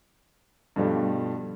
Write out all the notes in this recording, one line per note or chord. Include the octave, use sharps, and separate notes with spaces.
G2 B2 D3 F3 G3 A3